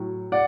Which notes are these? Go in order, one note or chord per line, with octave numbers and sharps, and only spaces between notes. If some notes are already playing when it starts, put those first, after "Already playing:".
Already playing: A2 F#3
D5 F#5